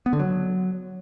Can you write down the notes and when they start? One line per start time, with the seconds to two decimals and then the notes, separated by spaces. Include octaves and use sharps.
0.06 B3
0.13 D3
0.19 F#3